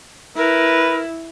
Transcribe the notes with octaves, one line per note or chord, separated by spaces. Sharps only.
E4 A#4 B4